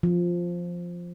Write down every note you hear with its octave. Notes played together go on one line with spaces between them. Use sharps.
F3